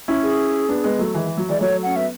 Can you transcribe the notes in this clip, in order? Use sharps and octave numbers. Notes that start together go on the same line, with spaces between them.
C#4 E4
G#4
B3 D4
G#3 B3
F#3 A3
E3 G#3
E3
F#3
E3 G#3 D5
F#3 A3 C#5
C#4 F#5
B3 E5